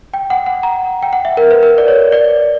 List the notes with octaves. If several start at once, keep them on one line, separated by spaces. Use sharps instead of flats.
G5
F#5
F#5
A#5
G5
F#5
E5
A#4
B4
A#4
D5
C#5
D5